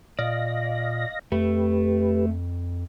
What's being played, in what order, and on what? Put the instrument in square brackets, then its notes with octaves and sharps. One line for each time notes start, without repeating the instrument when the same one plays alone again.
[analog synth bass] A#2 [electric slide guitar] D5 [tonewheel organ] D#5 F5 A#6
[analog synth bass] F2 [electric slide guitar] A3 [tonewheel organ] G4 B4